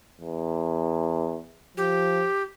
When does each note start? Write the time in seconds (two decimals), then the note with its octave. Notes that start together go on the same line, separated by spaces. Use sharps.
0.21 E2
1.77 F3 G4